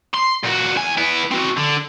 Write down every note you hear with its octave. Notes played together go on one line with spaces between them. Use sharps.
C6
A#2 F#4
E2 G#5
B3 E4
C4 F#4
D3